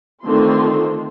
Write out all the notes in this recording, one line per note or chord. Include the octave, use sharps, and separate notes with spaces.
D3 D#3 A3 C4 F4 C6